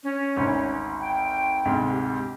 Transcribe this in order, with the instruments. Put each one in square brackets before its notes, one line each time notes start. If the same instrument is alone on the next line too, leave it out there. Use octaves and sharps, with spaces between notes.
[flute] C#4
[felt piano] G#1 D2
[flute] G5
[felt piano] D2 G#2 C3
[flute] G4